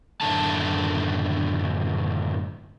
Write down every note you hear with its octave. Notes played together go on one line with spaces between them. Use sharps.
F#2 A2 D3 D#3 A3 A5